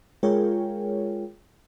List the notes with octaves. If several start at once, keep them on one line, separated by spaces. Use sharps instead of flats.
G#3 F4 G#4 A#4 C#5 G5